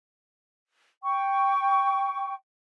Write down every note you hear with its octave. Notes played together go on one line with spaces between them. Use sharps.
G5 C#6